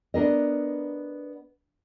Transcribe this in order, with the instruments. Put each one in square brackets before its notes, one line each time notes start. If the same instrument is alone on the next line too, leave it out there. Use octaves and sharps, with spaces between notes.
[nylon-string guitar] B3 D4 A#4 D#5